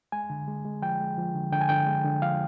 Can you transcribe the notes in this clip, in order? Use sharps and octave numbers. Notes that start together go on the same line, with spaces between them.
G#3 G#5
D3
G#3
G#3
F3 G5
G#3
F3
D3
D3 G5
G#5
D3 G5
G#3
D3
F3 F5